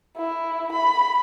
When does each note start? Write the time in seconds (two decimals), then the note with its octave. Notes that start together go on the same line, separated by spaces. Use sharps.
0.17 E4
0.72 B5